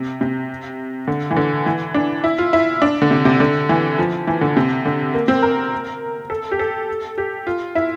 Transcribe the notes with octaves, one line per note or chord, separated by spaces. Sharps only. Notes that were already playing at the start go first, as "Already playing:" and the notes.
Already playing: C3
C3
D3
E3
D3
E3
D4
E4
F4
E4
D4
D3
C3
C3
D3
E3
F3
E3
D3
C3
D3
A#3
C4
A#4
A4
G4
A4
G4
F4
E4